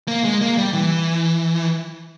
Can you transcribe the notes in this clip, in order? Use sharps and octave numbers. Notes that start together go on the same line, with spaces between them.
A#3
G#3
A#3
G3
E3